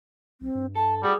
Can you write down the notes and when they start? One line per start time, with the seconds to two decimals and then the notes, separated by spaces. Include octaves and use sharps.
0.41 B1 C4
0.55 G2
0.75 A4 A5
1.03 A2 G3 F#4 G#4